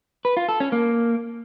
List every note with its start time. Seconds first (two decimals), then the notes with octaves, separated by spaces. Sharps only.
0.25 B4
0.37 F4
0.49 A4
0.60 C#4
0.72 A#3